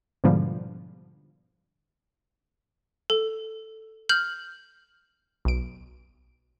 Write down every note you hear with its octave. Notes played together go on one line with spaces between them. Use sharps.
G#2 B2 D3 F3 G3
A4
F6 G6 F#7
B1 D7